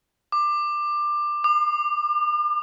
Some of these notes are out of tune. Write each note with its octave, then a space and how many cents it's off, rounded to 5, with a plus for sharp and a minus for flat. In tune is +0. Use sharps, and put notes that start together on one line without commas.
D6 +20
D6 +45